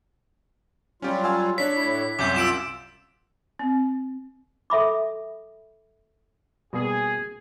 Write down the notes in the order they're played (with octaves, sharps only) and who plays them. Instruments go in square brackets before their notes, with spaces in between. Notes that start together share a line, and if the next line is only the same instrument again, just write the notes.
[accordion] F#3 G3 F4 [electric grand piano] C#4 G4
[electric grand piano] F5 G#5 E6
[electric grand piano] D4 C#5 [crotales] B6
[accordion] A2 E4
[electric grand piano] C2 F#2 [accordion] C#5 E5 [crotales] D6 G6
[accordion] F4 [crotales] E6 D7 E7
[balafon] C4
[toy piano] A4 E5 B5 D6
[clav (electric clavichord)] B2 G3 A#3 [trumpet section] G#4